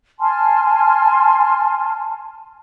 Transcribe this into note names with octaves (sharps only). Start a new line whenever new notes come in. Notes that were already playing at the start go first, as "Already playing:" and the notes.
G#5 A5 C6 F6